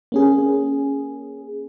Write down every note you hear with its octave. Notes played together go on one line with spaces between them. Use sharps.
A#3 C#4 G#4